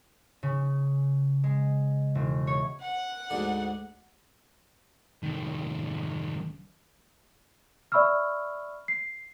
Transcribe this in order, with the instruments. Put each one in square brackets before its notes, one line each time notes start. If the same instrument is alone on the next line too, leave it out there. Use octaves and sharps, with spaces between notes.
[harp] C#3
G#3
E1
C#5
[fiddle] F#5
[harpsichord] D2 G#2 D3
[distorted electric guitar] C2 D#3
[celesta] D5 E5 B5 C#6 E6 F6
C7